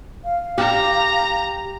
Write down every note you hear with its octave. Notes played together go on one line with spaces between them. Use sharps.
F5
G4 A#5